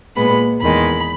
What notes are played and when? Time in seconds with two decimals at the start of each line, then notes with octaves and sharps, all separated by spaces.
0.16 A#2 G#3 B3 B5
0.61 E2 D#3 G#3 B5